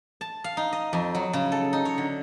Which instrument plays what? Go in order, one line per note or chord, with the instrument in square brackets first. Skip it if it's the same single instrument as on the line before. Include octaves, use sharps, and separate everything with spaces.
[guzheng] A5
F5
D#4
D#5
F2
F#3
C#3
A4
D#4
C#5
D3